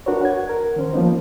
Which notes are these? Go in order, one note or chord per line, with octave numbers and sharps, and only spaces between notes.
D4 F#4 A#4 B4 C#5
F#5 G#6
A#4
D#3 C#4 C5
F3 A#3 B3 D#4